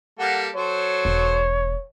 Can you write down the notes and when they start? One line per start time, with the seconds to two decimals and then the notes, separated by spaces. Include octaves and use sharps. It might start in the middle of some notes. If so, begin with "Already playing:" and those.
0.19 G3 A#3 A4 F#5
0.55 F#3 A4 C5 C#5
1.05 E1